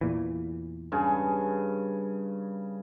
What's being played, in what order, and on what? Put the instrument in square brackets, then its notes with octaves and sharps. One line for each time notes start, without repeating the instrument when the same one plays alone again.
[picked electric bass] E2 A#2 E3
[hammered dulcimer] G2 C#3 G#4